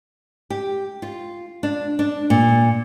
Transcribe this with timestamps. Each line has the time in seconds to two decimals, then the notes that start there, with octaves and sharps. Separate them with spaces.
0.50 G4
1.02 F4
1.63 D4
1.99 D4
2.30 A#2